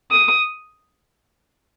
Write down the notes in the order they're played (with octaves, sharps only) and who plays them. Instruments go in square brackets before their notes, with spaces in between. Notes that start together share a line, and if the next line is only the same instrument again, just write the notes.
[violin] D#6